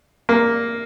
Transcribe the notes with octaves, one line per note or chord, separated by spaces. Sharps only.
A#3